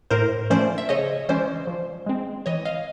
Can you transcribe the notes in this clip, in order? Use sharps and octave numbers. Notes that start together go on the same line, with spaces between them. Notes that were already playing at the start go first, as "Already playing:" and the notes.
A2 A#4 C5
F3 A3 C#4 C5 D5
E5
C#3 C#5 D#5
E3 G#3 C#4 C5 D5
F3
G#3 C4
E3 C#5 D#5
D#5 F5